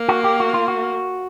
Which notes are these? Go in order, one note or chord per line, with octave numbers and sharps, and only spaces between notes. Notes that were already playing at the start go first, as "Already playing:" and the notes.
Already playing: A#3
F#4
G4
F#4
F4
F#4